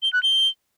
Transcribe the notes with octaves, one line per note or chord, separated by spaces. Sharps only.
G7
F#6
G7